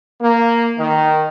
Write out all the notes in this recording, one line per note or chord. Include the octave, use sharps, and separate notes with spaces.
A#3
D#3